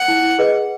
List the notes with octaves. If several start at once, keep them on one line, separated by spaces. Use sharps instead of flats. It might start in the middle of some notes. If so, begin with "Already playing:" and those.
Already playing: F#5
E4
G#4 B4 D#5